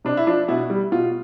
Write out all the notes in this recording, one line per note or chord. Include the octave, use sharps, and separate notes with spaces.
C3 D4
E4
F3 D4
B2 E4
G3
B2 F4